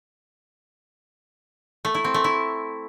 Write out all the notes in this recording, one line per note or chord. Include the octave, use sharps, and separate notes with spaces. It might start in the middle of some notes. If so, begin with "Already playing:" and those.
A3
E4
C4
A3
E4